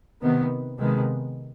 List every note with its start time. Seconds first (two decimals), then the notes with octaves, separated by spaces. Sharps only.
0.22 C3 D#3 B3
0.78 C3 D#3 G#3 B3